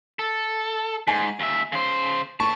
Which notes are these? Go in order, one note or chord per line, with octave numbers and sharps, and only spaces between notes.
A4
G#2 G#5
D#2 E5
C#3 C5
A2 A5 C#6